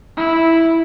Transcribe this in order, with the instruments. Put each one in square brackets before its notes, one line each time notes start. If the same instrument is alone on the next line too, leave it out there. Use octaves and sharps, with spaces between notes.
[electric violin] E4